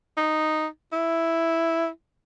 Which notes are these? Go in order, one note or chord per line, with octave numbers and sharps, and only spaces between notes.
D#4
E4